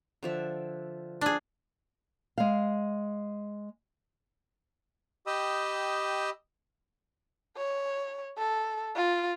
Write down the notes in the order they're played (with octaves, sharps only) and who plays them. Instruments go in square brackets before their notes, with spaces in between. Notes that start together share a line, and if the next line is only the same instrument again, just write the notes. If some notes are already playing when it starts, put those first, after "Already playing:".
[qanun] D3 F3 E5
[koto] D4 G#4
[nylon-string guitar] G#3 F5
[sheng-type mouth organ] G4 D#5 G5 B5 D#6 E6
[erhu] C#5
A4
F4